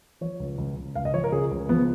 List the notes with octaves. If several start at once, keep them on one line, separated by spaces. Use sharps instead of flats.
F3 C#5
C#2
C#2
C#2
C#2 F5
D#5
F3 C#5
A#4
C#3 G#4
C#2
F3 B3